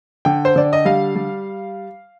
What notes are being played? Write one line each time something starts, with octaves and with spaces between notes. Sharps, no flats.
D3 G5
C5
D3 D5
D#5
G3 F5
G3